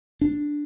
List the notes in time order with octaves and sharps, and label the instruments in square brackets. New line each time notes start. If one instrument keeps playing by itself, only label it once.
[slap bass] D4